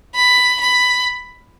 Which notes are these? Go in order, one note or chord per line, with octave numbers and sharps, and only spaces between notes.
B5
B5